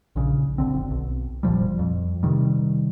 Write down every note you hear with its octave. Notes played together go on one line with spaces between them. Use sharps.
A#1 C#3
F#1 C#2 D3 C4
B1
F1 A#2 F3 G3
F2
C3 D#3 G3